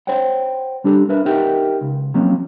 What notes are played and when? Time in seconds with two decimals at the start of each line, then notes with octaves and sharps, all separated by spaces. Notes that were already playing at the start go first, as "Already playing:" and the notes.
0.07 C5 C#5 F#5 G5
0.84 G3 D4 G4 A4
1.09 D4 A#4 B4 E5
1.25 D#4 G4 A#4 E5 F#5 G5
1.81 C#2
2.14 F3 F#3 A#3 C4 C#4